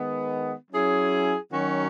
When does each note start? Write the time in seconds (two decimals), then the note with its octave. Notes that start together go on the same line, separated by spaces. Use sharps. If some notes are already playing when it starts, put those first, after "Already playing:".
Already playing: D#3 G#3 B3
0.71 F#3 C#4 E4 G#4
1.52 D#3 F#3 C#4 F#4